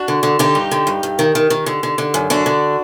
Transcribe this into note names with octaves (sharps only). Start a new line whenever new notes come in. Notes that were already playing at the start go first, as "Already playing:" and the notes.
Already playing: D4 F#4
D3
D3
D3 D#4 G4
G2
D3
G2
G2
D#3
D#3
D#3
D3
D3
D3
F#2
D3 D4 F#4
D3